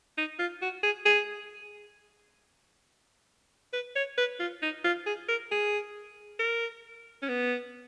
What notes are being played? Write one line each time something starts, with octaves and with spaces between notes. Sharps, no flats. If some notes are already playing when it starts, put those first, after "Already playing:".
D#4
F4
F#4
G#4
G#4
B4
C#5
B4
F4
D#4
F4
G#4
A#4
G#4
A#4
C#4
B3